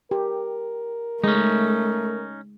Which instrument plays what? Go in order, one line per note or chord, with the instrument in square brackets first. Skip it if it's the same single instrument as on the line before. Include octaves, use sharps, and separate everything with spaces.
[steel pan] G4 [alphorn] A#4
[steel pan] G#3 [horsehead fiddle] A3 [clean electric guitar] C#4 D#4